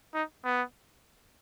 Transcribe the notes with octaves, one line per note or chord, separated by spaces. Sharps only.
D#4
B3